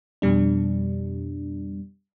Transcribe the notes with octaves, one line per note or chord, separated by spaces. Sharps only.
F2 B2 G3 D4